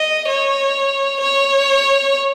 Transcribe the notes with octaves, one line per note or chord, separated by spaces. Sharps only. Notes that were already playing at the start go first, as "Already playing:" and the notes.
Already playing: D#5
C#5
C#5